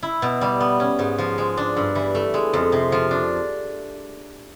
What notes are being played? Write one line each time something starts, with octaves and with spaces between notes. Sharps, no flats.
E4
B2
G3
B3
C#4
G#2
F3
G#3
D4
G2
E3
A3
G#3
F2
C3
F3
D4